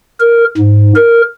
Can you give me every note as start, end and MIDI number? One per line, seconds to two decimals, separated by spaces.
0.20 0.44 70
0.57 0.92 44
0.95 1.22 70